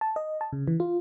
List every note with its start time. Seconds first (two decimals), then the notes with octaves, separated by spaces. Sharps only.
0.01 A5
0.16 D#5
0.41 A5
0.53 C#3
0.68 E3
0.80 F4